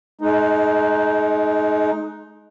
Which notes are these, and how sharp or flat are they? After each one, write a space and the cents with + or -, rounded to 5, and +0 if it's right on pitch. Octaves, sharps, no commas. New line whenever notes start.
G#3 +35 D#4 +0